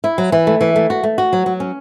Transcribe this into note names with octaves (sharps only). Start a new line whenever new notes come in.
E4
F#3
E3
A3
E3
A3
F#4
A3
F#4
F#3
F#3
C#4